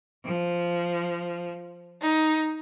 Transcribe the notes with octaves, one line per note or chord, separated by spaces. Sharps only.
F3
D#4